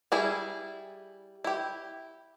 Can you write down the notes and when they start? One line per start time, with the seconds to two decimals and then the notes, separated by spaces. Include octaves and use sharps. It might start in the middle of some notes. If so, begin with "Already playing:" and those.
0.12 G3 E4 G#4
1.44 E4 G4